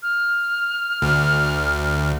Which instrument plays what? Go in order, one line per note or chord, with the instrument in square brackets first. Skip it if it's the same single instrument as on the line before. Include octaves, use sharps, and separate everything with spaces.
[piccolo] F6
[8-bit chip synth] D2